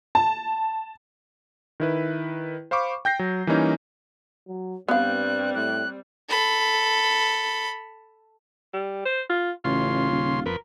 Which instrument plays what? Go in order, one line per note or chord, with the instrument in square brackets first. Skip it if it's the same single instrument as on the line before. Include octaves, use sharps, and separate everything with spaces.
[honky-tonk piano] A5
[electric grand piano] D#3 E4 B4
C5 F5 B5 C#6 D6
G5 G6 A#6 C7
F#3
E3 G3 A#3 C#4 D#4
[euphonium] F#3
[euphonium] G2 [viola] G3 C4 [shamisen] B3 F5 [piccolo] F#6
[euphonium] A2 [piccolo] F#6
[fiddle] A4 B5
[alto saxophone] G3
C5
F4
[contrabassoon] A1 [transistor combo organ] C#3 C6 [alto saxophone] F4
[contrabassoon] D#1
[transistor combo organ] F2 B4 [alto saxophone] A#4